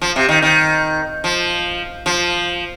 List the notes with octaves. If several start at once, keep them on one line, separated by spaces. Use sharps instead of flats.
F3
C3
D#3
D#3
F3
F3